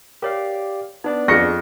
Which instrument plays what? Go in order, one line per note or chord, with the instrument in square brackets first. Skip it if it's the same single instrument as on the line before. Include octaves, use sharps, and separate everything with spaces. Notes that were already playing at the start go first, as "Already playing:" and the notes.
[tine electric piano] G4 D5 F5 [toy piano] A#4 C#5
[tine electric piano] B3 D4 D5 [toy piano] D#4
[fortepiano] F2 [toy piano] G#4 C#6 [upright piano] A#6 C#7